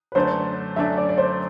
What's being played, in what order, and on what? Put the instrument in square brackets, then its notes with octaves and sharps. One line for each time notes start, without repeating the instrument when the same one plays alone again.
[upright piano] B4
[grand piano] F#2 D3 A3 D4 [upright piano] C5
[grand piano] F#2 D3 A3 D4 [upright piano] E5
[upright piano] D5
D5
C5